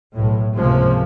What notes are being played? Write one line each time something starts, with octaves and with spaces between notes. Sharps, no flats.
B1 A2
C#2 G#2 C3 F3 G#3 A#3